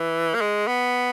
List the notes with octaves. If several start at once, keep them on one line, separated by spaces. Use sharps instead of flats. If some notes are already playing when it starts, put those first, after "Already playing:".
Already playing: E3
A#3
G#3
B3